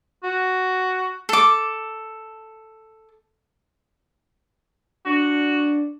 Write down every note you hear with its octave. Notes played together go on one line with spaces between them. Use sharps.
F#4
A4 D6
D4 F#4